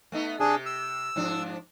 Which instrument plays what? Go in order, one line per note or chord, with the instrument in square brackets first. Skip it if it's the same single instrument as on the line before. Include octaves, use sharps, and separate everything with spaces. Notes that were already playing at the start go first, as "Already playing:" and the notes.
[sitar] A3 B3 D#4
[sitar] C3 G4 [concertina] D4 G#4
[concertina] E6
[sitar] G#2 F3 D4